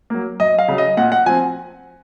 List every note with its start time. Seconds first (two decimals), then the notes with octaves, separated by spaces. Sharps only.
0.10 F#3 A#3
0.40 F#2 D#5
0.59 F5
0.68 C#3 F#3
0.78 D#5
0.97 A#2 F#5
1.12 F#5
1.26 F3 C4 G#5